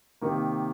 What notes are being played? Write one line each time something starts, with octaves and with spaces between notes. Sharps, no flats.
C3 D#3 A#3